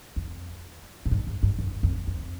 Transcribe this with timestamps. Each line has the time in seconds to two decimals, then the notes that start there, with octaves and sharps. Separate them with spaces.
0.16 F2
1.06 G#2
1.11 G2
1.27 G#2
1.43 G2
1.58 F#2
1.83 F2
2.07 F2